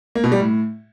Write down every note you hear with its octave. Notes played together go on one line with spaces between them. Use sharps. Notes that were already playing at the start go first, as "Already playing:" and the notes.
A#3
B2
G3
A2